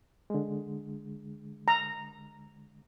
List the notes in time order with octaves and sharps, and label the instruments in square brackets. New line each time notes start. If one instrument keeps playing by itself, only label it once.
[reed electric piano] D3 G#3
[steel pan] A#5